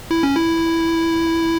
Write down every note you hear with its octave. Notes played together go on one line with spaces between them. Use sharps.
E4
C#4
E4